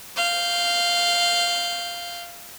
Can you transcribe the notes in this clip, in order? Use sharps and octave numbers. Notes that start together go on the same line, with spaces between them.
F5 G6